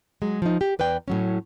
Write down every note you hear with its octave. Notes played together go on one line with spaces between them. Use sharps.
F#3 G#3
F3 D#4
G4
E2 B4 D5 G5
A2 F#3 C#4